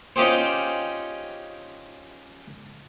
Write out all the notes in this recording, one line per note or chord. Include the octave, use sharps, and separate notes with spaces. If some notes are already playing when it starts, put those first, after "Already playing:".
C#4 D#4 F4 G4 G#4 C5